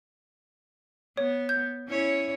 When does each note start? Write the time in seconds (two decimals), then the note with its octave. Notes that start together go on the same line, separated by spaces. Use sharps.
1.17 B3 C#5
1.49 G6
1.88 C#4 E4 C#5